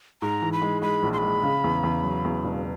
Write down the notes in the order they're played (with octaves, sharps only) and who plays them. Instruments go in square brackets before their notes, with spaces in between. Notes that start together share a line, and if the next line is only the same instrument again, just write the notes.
[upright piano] G#2 [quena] A#5
[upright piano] E3
[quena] B5
[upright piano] G#3
[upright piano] G#3 [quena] B5
[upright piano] A#1
[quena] C6
[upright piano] G#3 [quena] B5
[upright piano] C#3
E2
E2
F#3
E2
E1